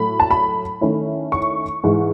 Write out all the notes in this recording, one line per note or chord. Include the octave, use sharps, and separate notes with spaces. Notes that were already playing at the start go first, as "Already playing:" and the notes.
Already playing: A2 F#3 A3 B5
A5
B5
D#3 A3 C#4 E4
C#6
G#2 E3 G#3